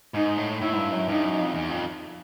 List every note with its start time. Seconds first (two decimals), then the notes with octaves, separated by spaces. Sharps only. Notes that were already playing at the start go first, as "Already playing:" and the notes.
0.14 G#2 D#4
0.38 A2
0.61 A2 E4
0.73 G#2
0.77 G2
0.92 F#2
1.08 G2 D#4
1.23 F#2
1.40 F2
1.54 E2
1.70 F2